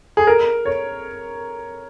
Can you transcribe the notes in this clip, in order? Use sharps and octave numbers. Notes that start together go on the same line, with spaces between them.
G#4
A#4
C#5